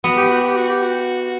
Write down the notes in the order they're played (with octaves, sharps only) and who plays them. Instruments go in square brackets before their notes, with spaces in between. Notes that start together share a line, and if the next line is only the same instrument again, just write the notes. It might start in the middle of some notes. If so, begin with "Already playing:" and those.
[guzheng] B3 [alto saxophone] F#4
[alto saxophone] G4
F#4
G4
F#4
G4
F#4